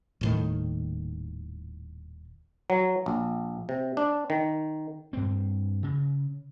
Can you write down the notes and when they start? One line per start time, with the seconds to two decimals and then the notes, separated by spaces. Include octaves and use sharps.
0.21 D#1 A2 D#3
2.70 F#3
3.06 A#1
3.69 C3
3.97 D4
4.30 D#3
5.13 G2 C4
5.83 C#3